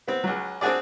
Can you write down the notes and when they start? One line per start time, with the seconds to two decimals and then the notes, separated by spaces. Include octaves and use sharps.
0.08 B3 C4
0.24 C#2 F#3
0.61 C4 D4 F#4 G#4 D5